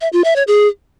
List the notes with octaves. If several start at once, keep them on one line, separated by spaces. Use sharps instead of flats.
E5
F4
E5
C#5
G#4